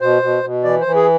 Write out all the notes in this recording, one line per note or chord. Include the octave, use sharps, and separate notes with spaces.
B2 C5
B2
B2
E3 D5
C5
E3
G#4